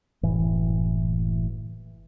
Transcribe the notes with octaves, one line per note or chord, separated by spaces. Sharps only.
F#1 A2 E3